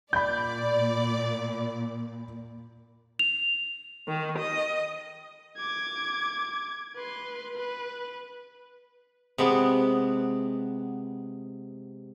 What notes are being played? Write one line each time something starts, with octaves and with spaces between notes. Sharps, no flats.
A#2 D5 B5 G6
F7
D#3
D#5
D6 G#6
B4 C6
B4
C3 G#3 B3